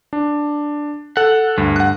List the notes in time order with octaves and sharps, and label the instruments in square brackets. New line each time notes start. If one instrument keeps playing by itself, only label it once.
[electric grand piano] D4
[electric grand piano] A4 [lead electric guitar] F#5
[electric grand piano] D2 [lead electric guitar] G2
[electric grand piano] F#5 F#6